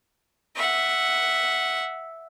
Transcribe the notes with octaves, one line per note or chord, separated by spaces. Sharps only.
E5 F#5